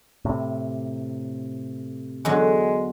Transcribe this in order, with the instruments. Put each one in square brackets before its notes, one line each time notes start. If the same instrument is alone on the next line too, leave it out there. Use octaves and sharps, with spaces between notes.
[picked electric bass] A2 C3
[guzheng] E2 D3 F#3 [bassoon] G#3